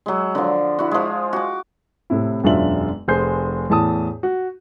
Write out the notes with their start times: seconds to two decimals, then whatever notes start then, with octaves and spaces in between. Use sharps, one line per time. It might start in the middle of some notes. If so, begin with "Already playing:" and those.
0.06 F#3 G#3
0.35 D3 F3
0.79 E4 F#4
0.91 F3 G#3
1.33 F#4 D6
2.10 A2 C3 E4
2.44 E1 F#2 D4 F4 E5 F#7
3.08 F1 G#4 C5 G6 C7
3.69 E2 A2 A5 D#6
4.23 F#4